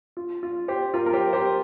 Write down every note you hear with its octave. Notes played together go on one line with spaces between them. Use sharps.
F4
F4
G4 C5
F4 A#4
A#4
G4 C5
G4 C5